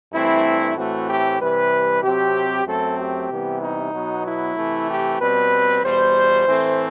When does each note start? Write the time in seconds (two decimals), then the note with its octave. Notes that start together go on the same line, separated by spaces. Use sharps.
0.12 G2 E3 A3 C4 E4
0.76 A2 E3 A3 C4 F#4
1.08 G4
1.40 C3 E3 G3 B4
2.03 C3 F#3 C4 G4
2.66 F#2 F#3 A3 C4 A4
2.98 G4
3.30 C3 E3 G3 B3
3.61 D#4
3.93 B2 F#3 B3
4.25 E4
4.56 C3 E3 A3 C4
4.89 G4
5.19 B2 G3 C4 B4
5.83 E2 B2 G3 C5
6.47 A2 E3 A3 C4